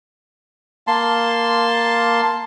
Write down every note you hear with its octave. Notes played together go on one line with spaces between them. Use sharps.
A#3 A5 C6